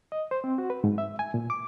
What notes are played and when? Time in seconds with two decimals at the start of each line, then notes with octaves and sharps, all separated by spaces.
0.12 D#5
0.31 C5
0.44 C4
0.58 F#4
0.70 B4
0.84 G#2
0.98 E5
1.19 G#5
1.34 A#2
1.50 D6